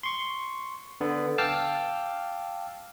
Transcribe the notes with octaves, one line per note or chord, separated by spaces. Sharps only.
C6 C#6
D3 B3
F5 G5 A5 D6 E6 F6